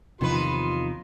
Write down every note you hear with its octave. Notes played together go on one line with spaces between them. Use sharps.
E2 C3 D#3 F3 F4 B4 C6